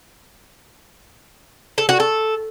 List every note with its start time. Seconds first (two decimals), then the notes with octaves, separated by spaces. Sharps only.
1.78 A4
1.89 F#4
2.00 A4